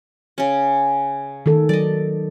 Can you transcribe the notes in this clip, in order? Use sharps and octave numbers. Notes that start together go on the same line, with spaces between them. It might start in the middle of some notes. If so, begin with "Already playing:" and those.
C#3 C#4
D#3 A4
F#3 D5 D#5